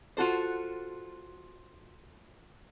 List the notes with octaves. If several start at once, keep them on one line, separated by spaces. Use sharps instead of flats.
F4 F#4 A4 C5